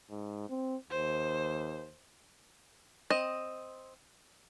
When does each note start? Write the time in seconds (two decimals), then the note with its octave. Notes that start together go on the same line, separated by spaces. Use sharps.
0.10 G#2
0.49 C4
0.90 D#2 C5
3.10 C4 D#5